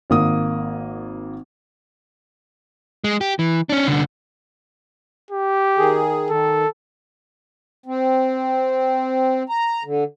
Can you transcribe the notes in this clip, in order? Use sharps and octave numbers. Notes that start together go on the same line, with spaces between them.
G#1 A#3 D#6
G#3
G4
E3
C#4 D4
C2 D3
G4
D#3 G#4
D#3 A4
C4
A#5
D3